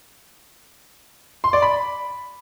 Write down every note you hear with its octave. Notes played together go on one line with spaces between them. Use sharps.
C6
D5
B5